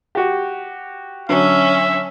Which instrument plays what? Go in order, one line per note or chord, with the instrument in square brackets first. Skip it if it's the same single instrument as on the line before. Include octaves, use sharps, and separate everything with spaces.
[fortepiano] F#4 G4
[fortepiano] D3 F#3 [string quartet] C#4 [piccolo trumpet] E5